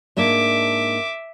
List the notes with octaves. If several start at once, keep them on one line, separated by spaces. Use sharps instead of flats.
G#2 A#3 D4 E5 D6